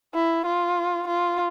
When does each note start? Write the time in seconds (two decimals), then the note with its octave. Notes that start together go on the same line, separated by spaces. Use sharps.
0.15 E4
0.46 F4
1.07 F4